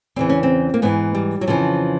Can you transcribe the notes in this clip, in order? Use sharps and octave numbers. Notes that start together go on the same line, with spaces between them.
E2 C#3 E3 C4
C#4
C4
A#3
G#2 E3 B3
G3
F#3
F2 C#3 E3 F3